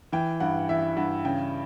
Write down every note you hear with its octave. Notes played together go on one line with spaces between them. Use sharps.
E3 G5
G2 F#5
E3 E5
G2 F#5
C#3 G5